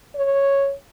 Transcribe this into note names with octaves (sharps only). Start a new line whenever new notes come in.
C#5